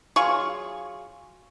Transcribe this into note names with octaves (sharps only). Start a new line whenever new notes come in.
F#3 F4 G#4 C#6